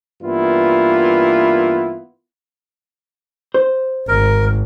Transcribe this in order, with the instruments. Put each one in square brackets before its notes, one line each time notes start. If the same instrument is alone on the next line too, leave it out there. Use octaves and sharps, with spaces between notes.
[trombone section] G2 E3 A#3 B3 E4 F4
[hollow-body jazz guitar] C5
[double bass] G#1 [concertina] A#4